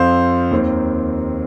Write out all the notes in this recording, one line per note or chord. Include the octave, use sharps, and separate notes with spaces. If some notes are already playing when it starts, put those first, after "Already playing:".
Already playing: F2 F3 C4 C5 F5
D#2 D#3 C4